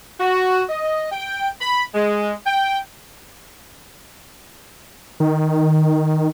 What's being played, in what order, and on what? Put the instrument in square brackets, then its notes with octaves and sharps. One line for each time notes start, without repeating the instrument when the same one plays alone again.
[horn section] F#4
D#5
G5
B5
G#3
G5
[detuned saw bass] D#3